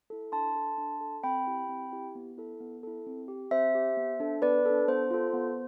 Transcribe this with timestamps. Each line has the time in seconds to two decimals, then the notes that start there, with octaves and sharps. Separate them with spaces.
0.10 E4 A4
0.32 D4 A5 C6
0.56 A4
0.78 D4
1.01 A4
1.23 C4 G5 B5
1.47 E4 G4
1.69 C4
1.93 E4 G4
2.15 B3
2.38 E4 A4
2.60 B3
2.83 E4 A4
3.06 C4
3.28 G4
3.51 C4 C5 E5
3.75 G4
3.97 B3
4.20 D4 A4
4.42 B3 B4 D5
4.66 D4 A4
4.88 B3 C5
5.11 F4 A4
5.33 B3